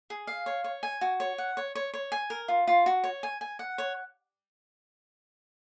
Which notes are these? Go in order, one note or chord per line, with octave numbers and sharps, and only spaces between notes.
G#4
F5
C#5
C#5
G#5
F#4
C#5
F#5
C#5
C#5
C#5
G#5
A#4
F4
F4
F#4
C#5
G#5
G#5
F#5
C#5